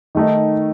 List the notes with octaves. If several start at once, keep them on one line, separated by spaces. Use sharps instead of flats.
D#3 A3 D#4